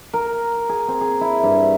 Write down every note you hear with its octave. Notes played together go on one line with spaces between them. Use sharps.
A#4
G#4
C4
G#4
E4
G2